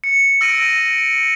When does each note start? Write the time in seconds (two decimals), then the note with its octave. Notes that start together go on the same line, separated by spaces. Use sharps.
0.04 C#7
0.41 E6 A#6 D7 D#7